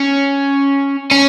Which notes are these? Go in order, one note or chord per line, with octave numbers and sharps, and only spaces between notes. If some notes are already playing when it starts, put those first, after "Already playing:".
Already playing: C#4
C#4